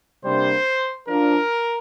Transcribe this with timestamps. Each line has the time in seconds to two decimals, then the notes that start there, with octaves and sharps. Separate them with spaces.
0.24 C3 G3 A#3 D4 C5
1.08 F3 D4 A#4